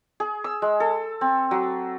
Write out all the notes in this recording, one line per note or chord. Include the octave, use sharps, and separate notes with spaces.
G#4
E6
G#3
A4
C4
F#3